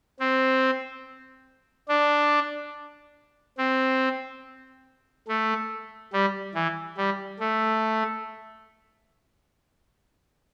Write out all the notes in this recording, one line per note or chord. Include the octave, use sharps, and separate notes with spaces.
C4
D4
C4
A3
G3
E3
G3
A3